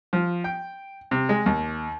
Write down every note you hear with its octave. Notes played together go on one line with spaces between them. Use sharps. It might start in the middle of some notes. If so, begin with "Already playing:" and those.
F3
G5
C3
G#3
D#2